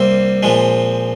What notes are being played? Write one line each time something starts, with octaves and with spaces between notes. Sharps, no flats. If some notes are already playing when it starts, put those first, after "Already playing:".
Already playing: C2 C3 G3 A#3 C4 C5
A#2 F3 G#3